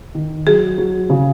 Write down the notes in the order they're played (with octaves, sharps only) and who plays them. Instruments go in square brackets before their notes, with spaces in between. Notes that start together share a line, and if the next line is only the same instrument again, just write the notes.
[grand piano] D#3
[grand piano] F#3 [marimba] G#4
[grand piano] F#3
C#3